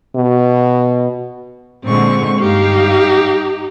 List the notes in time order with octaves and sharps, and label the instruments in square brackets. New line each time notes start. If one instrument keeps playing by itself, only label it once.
[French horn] B2
[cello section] A#2 D3 G#3 [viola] C4 C#6
[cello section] G2 F5 [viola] D#4 G4